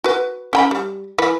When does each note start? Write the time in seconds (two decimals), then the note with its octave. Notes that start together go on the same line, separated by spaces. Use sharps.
0.04 F#4 B4
0.53 C#4 G5 B5
0.71 G3
1.18 E3 B4